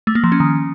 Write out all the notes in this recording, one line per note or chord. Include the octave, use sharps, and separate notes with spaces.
A3
A#3
F3
C#4
D#3